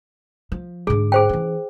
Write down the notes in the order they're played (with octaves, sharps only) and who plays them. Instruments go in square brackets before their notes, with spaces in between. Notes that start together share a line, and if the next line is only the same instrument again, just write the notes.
[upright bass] F3
[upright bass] G#2 D3 [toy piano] G#4
[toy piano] G#4 C5 G5
[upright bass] E3 C#4